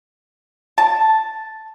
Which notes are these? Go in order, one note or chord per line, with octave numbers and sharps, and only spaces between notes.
A5